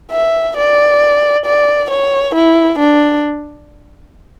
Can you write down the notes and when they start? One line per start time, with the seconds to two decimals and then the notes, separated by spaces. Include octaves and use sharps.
0.11 E5
0.57 D5
1.46 D5
1.90 C#5
2.35 E4
2.79 D4